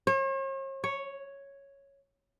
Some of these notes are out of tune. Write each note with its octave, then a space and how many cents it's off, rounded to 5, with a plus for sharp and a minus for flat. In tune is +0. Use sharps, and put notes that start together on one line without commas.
C#5 -45
C#5 +0